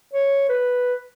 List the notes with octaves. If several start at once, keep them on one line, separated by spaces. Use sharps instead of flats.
C#5
B4